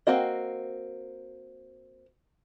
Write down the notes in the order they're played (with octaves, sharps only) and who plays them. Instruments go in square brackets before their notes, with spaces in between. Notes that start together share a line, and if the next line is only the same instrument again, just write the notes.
[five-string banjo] A#3 C4 F#4 D#5